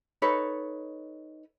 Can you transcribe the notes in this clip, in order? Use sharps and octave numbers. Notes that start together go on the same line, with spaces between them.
D#4 A4 B4 C#5